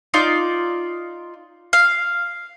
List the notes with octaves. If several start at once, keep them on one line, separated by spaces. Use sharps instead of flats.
D#4 F4 D5
F5